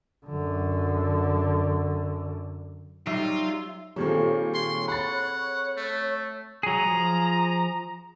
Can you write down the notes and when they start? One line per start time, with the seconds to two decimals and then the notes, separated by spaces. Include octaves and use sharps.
0.26 F#2 D3
3.07 F#3 G3 D#4 F4 E5
3.96 A#2 D#3 G3 C4 G#4 A4 C#5
4.54 C6
4.88 F#5 B5 A6
5.77 A3
6.63 F#3 G#4 A#5
6.87 F3 G#4